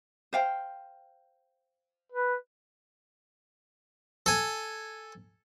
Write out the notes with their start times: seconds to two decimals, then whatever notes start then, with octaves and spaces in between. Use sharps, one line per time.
0.33 C5 F5 G5
2.12 B4
4.26 A4 G#5